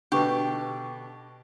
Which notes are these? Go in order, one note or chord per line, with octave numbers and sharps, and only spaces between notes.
B2 D3 G4 B4 C#6 G6